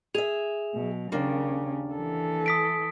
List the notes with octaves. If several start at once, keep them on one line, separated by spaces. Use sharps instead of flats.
G#4 E5 F7
B2 F#3
D#2 C#3 A#3 D4
E3 A4
D#6 B6 D7